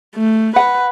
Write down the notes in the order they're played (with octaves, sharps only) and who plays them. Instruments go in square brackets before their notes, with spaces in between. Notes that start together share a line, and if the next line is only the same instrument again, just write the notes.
[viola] A3
[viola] B4 [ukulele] F#5